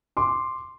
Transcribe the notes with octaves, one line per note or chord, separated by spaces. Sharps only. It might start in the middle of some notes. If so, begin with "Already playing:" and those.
C6 D6